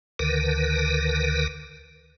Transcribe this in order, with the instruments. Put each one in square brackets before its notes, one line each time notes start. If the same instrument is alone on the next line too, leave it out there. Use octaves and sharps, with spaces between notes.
[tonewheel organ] D2 D3 D#3 A#4 B4